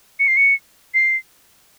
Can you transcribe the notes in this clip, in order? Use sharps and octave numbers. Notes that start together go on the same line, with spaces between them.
C#7
C7
C#7
C7